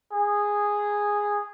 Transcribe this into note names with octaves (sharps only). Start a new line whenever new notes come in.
G#4